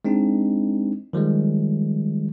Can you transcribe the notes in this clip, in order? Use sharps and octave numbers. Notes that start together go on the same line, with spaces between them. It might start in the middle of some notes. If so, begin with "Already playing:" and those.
G#3 C4 D4 D#4
D#3 F3 G3 G#3